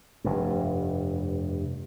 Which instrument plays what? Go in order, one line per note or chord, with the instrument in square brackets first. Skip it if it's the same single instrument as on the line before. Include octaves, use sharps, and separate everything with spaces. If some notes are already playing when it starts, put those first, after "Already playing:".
[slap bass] F1 G2